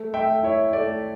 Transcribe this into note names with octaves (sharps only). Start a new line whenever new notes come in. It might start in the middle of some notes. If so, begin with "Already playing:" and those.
Already playing: A3
A3 E5 G5
E4 C#5 E5
A3 D5